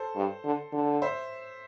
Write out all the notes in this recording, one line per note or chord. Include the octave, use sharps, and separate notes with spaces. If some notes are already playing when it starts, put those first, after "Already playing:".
Already playing: A4 C5
G2
D3
D3
C5 E5